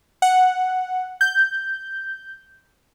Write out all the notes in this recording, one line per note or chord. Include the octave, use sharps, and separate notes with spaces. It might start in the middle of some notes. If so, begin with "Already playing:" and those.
F#5
G6